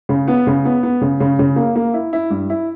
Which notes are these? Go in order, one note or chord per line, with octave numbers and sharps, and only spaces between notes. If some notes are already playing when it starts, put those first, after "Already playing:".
C#3
B3
C#3
B3
B3
C#3
C#3
C#3
A#3
A#3
E4
E4
G2
E4